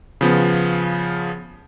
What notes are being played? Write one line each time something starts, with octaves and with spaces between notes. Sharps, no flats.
C#3 F3 B3